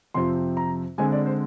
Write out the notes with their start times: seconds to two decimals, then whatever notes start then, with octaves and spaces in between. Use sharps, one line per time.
0.14 F2 C3 F3 C4 C6
0.57 A#5
0.98 D3 G#3 C4 G#5
1.12 D5
1.26 C5